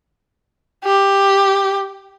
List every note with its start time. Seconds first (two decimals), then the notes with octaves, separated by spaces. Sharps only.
0.84 G4